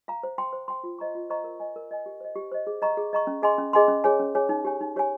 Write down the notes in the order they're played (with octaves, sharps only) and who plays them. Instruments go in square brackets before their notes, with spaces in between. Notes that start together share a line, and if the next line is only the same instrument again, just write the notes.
[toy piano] F5 A#5
C5
G5 C6
C5
G5 C6
F4
C5 D#5 A#5 C#6
F4
C5 D#5 A#5 C#6
A#4
D#5 G#5
A#4
D#5 G#5
G4
C5 D#5
G4
C5 D#5
G#4
D#5 A#5 C#6
G#4
D#5 A#5 C#6
C#4
G#4 D#5 G#5 C6
C#4
G#4 D#5 G#5 C6
C#4
G#4 C#5 G#5
C#4
G#4 C#5 G#5
D#4
G4 C#5 G#5
D#4
G4 C#5 G#5